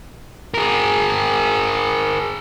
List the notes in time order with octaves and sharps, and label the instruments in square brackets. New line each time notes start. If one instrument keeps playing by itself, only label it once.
[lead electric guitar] G#4 A#4